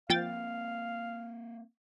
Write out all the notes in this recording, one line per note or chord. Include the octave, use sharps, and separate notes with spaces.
F3 A#3 C4 F5 G5 A6